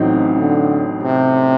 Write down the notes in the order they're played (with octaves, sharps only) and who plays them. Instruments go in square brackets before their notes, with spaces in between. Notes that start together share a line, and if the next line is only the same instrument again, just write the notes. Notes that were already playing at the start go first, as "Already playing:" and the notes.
Already playing: [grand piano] A1 A2 F#3 C4 D#4
[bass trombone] D3
C3